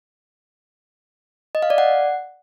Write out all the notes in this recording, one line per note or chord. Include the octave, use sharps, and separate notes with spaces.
D#5
F5
D5
F#5